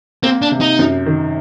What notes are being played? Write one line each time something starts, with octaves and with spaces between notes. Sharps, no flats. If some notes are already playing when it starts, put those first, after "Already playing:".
A#3 C4
D4
C3
D#4
F#2
D#3